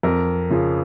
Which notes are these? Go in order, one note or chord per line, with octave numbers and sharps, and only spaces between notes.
F2 A#4
C#3 F3